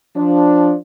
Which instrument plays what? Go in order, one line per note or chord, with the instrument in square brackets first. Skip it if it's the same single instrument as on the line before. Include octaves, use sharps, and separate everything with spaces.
[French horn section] F3 D4